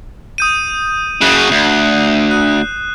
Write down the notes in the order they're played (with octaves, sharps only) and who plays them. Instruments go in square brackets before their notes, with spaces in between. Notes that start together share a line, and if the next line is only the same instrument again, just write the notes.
[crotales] D#6 G6 D#7
[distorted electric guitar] F#2 C#3 [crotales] F#6 C7 E7
[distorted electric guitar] D2
[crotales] F#6